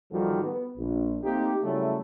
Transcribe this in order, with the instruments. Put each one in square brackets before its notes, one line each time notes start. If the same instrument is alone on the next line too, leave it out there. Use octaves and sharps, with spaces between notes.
[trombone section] A1 D#3 F3 G3 F#4 A4
B3
A#1
A3 A#3 C4 D#4 G4
C#3 F#3 G3 A3 C#4 E4